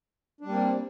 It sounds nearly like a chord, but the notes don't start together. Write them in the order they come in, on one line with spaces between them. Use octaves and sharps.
D4 G3 A#3 C4